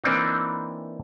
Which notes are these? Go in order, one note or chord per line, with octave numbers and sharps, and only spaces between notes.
E3 A#3 C4 D4 D#4